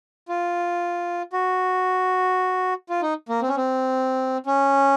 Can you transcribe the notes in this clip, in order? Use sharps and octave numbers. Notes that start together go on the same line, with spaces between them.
F4
F#4
F4
D#4
A#3
C4
C#4
C4
C#4